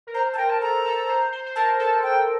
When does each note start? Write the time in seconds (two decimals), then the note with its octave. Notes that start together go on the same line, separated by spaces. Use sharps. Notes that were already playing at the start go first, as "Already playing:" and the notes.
0.07 A#4
0.14 C5 A#5
0.33 A5
0.37 A#4 G5
0.49 A5
0.61 A4 A#5
0.85 A4
1.09 C5
1.32 C5
1.46 C5
1.55 A#4 A5
1.79 A4 A5
2.03 G5